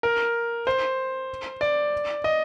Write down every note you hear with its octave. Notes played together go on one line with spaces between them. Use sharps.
A#4
C5
D5
D#5